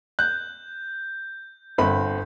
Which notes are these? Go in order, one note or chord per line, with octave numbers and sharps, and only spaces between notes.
F#6 G6
G1 C4 B5